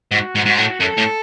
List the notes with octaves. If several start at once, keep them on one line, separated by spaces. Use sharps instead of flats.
G#2 F#4
G#2
G#2 F#4
A2
F#2 A4
A2